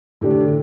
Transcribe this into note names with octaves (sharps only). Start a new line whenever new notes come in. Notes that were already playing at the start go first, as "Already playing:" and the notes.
A2 D3 A3 D4 G4
C3
D3